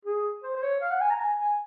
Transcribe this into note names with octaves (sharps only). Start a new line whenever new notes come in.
G#4
C5
C5
C#5
F5
F#5
G#5
A#5
G#5
G#5